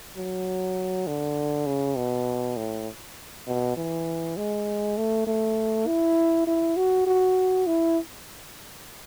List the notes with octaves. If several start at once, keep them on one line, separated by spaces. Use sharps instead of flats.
F#3
D3
C#3
B2
A2
B2
E3
G#3
A3
A3
E4
E4
F#4
F#4
E4